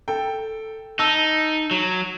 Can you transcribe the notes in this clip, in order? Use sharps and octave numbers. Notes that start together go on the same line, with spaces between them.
A4 G5
D#4 A5 E6
F#3